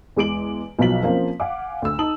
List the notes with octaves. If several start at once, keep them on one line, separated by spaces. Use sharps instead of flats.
E2 G#3 D6 D7 F#7
B1 B2 F3 F#3 B6 F#7
F3 A#3 C4 C#4
F5 F#5 G#5 D6
D2 E6
D#4 A5 D#6 F#7